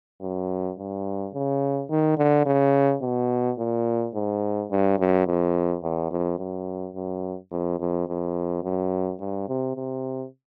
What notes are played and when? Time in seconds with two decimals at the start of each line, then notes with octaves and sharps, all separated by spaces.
0.22 F#2
0.78 G2
1.34 C#3
1.90 D#3
2.17 D3
2.46 C#3
3.02 B2
3.59 A#2
4.15 G#2
4.71 G2
4.99 F#2
5.26 F2
5.83 E2
6.11 F2
6.39 F#2
6.95 F#2
7.52 F2
7.80 F2
8.08 F2
8.63 F#2
9.20 G2
9.49 C3
9.75 C3